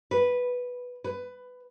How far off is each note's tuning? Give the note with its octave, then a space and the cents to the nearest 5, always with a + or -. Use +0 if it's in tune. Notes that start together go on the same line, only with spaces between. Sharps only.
B4 -5
B4 +15